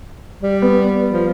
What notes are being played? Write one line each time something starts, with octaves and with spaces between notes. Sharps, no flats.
G3
B3
F3